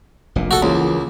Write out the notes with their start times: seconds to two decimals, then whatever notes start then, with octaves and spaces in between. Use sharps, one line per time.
0.36 F1 A#1 A#2
0.51 F#4 A4
0.62 C#2 E3 A#3